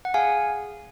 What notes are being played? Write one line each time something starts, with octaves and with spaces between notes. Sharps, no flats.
F#5
G#4 F5 G#5